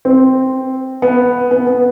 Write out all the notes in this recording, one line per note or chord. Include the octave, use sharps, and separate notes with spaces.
C4
B3
B3
B3